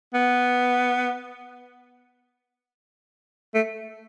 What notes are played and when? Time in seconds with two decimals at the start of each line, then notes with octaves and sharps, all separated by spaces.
0.14 B3
3.55 A3